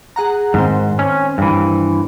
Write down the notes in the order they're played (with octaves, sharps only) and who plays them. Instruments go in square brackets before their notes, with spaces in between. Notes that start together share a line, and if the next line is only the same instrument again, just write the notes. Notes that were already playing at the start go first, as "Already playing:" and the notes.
[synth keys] G#4 F#5 A#5
[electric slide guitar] G#2 [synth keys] D#3 C4 C5
[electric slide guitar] C#4
G2 E3